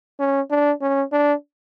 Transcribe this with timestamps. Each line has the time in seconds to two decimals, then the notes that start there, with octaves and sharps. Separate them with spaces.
0.20 C#4
0.51 D4
0.81 C#4
1.12 D4